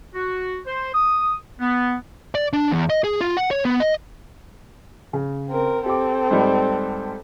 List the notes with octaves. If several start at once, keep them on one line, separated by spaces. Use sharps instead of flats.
F#4
C5
D#6
B3
D5
D4
E2
D#5
G#4
F4
F#5
C#5
B3
D#5
C#3
C4 A#4
C4 G4 A4 D6
G#2 G3